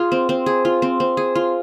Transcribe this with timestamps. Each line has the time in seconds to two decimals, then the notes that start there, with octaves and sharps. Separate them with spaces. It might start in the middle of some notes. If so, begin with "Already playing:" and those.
Already playing: F4 G#4
0.12 C4
0.29 C4
0.46 G#4
0.65 F4
0.82 C4
1.00 C4
1.17 G#4
1.35 F4